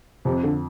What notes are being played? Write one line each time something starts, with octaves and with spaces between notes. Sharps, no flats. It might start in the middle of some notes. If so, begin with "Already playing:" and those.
F2 C3
D3